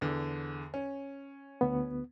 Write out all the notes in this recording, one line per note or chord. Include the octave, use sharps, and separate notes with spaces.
E2 D3
C#4
D2 B3